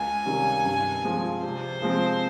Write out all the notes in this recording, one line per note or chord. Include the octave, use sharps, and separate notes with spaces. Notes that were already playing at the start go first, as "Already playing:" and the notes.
Already playing: C#2 G#5
C3 D#3 G3 C#4
G2
F3 G#3 C4 F4
C3 C5
F3 G#3 C4